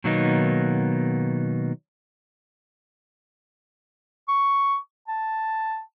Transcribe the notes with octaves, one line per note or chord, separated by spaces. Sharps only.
B2 D#3 F#3 A#3 B3 D#4
C#6
A5